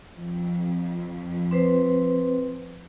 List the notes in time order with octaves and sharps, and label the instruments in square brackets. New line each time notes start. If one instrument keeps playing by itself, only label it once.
[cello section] F2
[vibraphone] C4 B4 C5